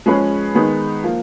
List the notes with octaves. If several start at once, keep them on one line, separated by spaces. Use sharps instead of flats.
F3 G#3 C#4 G#4 B4
D#3 G#3 B3 D#4
F3 A#3